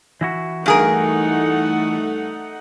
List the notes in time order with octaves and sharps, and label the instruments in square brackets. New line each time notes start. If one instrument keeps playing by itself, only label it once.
[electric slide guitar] E3 E4 F#4
[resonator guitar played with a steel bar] G2 G#4 A#4 [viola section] A3 D#4 F#5